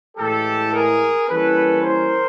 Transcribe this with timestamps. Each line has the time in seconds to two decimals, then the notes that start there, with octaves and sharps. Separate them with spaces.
0.18 A2 E3 G#3 G4 A4
0.73 G#4 A#4
1.28 E3 G3 A#3 C#4 A4 B4
1.83 A#4 C5